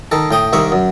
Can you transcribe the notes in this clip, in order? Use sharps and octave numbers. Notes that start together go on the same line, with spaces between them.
D#3 A4
A2 G5 D#6
C2 D#3 E5 C#6
F#2